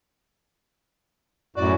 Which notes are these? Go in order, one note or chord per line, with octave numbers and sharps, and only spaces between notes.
F#2 A2 F#4 D5